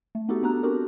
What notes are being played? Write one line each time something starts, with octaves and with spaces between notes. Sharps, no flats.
A3
B3 D#4 F#4 G4 A4
B3 D4 A4 A#5 F#6
C4 D4 F#4 G4 A#4